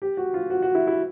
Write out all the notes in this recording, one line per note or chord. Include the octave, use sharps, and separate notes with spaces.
G4
F#4
F4
F#4
F#4
E4
E4